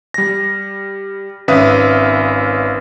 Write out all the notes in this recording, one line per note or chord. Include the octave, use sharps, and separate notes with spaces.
G3 A#6
G#1 C#4 B4 E5 F5 D#6